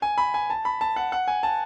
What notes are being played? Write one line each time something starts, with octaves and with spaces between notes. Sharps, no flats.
G#5
B5
G#5
A5
B5
A5
F#5
F#5
G#5
A5